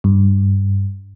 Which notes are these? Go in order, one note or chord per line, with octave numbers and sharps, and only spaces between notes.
G2